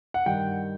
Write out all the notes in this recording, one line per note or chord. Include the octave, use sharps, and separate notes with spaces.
F#5
G2 D#3 G5